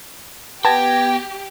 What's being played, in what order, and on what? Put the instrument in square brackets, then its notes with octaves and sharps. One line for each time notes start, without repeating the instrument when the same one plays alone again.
[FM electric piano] B3 G#6 A#6 [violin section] G4 [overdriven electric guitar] G5 [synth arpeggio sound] A5